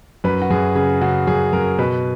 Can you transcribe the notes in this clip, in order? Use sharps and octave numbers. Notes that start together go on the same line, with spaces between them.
F#2 B4
F#4
F#2 G#4
C#3 G#4
C#3 F#4
F#2 G#4
F#2 A#4
B2 B4